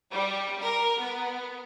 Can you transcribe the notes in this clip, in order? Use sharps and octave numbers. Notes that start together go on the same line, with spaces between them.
G3
A#4
B3